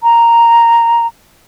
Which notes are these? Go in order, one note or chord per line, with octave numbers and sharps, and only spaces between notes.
A#5